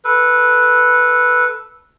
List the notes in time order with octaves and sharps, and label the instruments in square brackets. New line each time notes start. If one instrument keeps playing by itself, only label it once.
[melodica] A4 B4